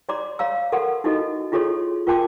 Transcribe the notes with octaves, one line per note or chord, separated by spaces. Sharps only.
C#5 D5 A#5 C6 D6
C#5 F5 A#5 E6
A4 A#4 F#5 C6
D#4 E4 F#4 A4 D#5
E4 F4 G#4 A4 C#5 C6
F4 A#4 G5 A5 C6 D6